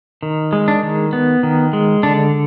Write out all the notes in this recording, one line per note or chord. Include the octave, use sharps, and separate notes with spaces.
D#3
G#3
D4
D#3
B3
D#3
G#3
D3 D4